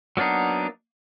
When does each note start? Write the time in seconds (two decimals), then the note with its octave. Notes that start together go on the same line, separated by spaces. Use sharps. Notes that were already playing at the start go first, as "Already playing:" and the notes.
0.17 F#3 A#3 B3 D4 D#4